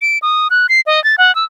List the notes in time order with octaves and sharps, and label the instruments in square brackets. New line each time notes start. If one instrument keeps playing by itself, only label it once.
[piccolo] D7
D#6
F#6
C7
D#5
A6
F#5
E6